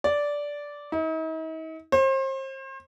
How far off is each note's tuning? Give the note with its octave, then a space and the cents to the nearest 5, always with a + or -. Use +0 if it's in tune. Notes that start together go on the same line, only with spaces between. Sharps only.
D5 -10
D#4 +45
C5 +35